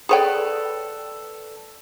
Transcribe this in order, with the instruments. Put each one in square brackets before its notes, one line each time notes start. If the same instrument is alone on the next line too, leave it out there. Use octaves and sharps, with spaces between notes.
[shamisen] G#4 C#5 G5 [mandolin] A4 B4 D5